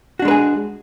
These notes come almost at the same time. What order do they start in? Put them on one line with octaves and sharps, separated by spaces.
F#4 D4 G#3 B4 G#4